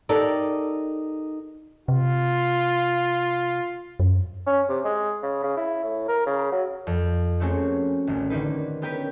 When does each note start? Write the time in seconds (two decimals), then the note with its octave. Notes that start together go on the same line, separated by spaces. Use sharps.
0.09 D#4 G4 A4 A#4 D5
1.88 C3 F4
4.00 F#2
4.47 C#4
4.69 C3
4.85 G#3
5.23 C#3
5.43 C#3
5.57 E4
5.84 A2
6.08 A#4
6.27 C#3
6.52 F#3
6.87 F2
7.40 A3 A#3 C4 C#4 F#4 G#4
8.07 D#1 A1
8.30 D3 D#3 A#3 D#4 B4
8.82 B3 C#4 G4 A#4 B4